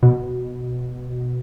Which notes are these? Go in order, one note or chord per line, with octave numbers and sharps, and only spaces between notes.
B2